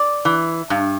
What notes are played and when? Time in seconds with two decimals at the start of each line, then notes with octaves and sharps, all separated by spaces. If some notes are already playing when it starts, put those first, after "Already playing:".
Already playing: D5
0.25 E3
0.70 G2